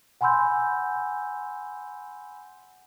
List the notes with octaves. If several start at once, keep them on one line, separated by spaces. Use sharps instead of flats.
F#5 G#5 B5 C6 E6 G6